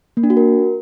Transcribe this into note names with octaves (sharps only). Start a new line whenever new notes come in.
A#3
D4
F#4
A#4